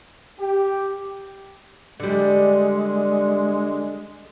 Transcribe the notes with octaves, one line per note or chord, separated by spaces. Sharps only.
G4
D3 G3 G#3